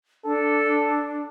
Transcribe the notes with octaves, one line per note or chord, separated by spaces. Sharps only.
D4 A4